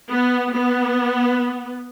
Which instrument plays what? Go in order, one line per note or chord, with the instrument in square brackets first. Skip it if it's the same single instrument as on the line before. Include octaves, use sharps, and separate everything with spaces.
[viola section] B3
B3